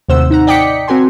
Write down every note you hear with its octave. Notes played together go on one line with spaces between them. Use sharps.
D#2 A2 C3 C5 F#5 E6
D#4 F#5 A#5
D5 D#5 G5 D6 B6 C#7
C4 F#4 A#4 G#5 C6